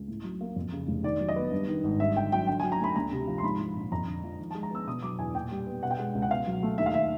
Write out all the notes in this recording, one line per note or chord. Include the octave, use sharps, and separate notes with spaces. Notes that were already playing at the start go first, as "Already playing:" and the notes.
Already playing: C#2
A2
F#3
A#3
F2
C#3
F1
D#3 D5
F#3
D#5
B3
G2
D#3
G#1
G2 E5
D3 G5
F#3 G5
D3 G5
G#5
F#3
A#5
A3 B5
D2 A#5
C3
F3
C6
G#2 B5
F3
A#1
F2 A#5
D3
F3
D#3
A5
G#3
A#5
B3 E6
B2 D#6
F#3 D6
E2 G#5
A#2 G5
G3
B3
B2 F#5
G5
G#3 F#5
C#2
F#5
B2 F5
F#3
A3
D#2 E5
F5
D#3 E5